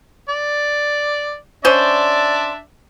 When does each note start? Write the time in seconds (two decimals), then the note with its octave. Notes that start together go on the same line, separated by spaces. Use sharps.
0.29 D5
1.65 C#4 D4 C5 D5 E5